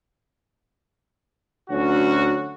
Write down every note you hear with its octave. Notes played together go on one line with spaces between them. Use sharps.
D2 F#3 C#4 F#4